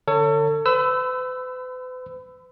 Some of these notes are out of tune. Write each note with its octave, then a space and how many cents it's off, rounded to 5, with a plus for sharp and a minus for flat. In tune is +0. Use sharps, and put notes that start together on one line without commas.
D3 +0 A4 +35 C#5 +10
B4 +45 B5 +30 E6 +0